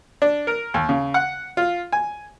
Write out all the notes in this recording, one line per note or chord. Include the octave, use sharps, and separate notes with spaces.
D4
A#4
D#2
C#3
F#5
F4
G#5